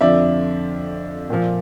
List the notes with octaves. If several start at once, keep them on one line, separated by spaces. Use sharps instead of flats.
F2 D3 F3 D5 E5
A#2 F3